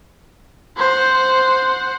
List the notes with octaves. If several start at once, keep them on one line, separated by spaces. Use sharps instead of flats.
C5 F#5